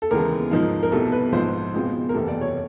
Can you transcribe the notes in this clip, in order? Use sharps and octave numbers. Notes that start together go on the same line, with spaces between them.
A4
D#2 C#3 E3 G#3 B3 A#4
G#2 F3 A#3 D#4
A#4
C2 B2 G3 A4
B4
A#1 G#2 F3 C5
C#2 B2 G#3 C4 F4
A#4
F#1 E2 C3 E3 G3 A4
D5
C#5